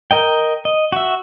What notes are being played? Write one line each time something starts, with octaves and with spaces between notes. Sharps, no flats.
A#4 D#5 G5
D#5
F#4 E5